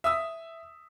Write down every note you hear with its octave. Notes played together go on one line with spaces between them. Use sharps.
E5 D#6 E6